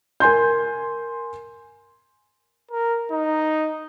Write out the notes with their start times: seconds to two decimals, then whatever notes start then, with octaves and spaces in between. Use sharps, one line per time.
0.20 A#4 G#5 C6 G6
2.71 A#4
3.11 D#4